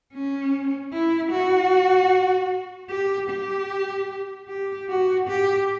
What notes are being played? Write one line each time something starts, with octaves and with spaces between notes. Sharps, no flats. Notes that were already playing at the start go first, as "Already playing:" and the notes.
C#4
E4
F#4
G4
G4
G4
F#4
G4